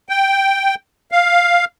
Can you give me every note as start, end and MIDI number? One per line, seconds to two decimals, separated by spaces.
0.09 0.75 79
1.11 1.65 77